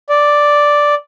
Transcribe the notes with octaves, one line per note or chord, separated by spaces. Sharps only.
D5